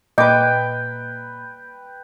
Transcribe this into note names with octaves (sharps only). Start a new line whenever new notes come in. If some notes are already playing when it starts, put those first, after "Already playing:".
A#2 B4 D#5 G5 D6